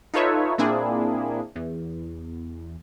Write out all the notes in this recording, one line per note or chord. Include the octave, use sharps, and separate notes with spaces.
D#4 F4 A4 B4 C#5 E5
A#2 A#3 C4 D4 E4 G#4
E2